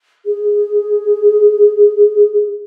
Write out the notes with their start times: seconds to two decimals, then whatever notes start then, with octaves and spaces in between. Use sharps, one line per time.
0.26 G#4